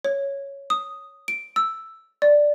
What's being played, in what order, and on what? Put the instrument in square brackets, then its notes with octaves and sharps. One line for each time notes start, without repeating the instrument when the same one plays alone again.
[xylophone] C#5
D#6
D7
E6
D5